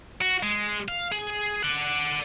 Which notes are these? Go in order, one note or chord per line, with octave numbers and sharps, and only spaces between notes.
F#4
G#3
F5
G#4
D5 F#5